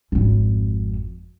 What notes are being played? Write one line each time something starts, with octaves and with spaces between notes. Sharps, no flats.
G#1 F2